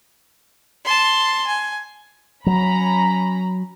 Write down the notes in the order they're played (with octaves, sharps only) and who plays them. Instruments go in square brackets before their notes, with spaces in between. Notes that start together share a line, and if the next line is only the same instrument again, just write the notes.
[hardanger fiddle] A5 C6
G#5
[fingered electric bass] F#3 [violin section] C#4 A#5 B5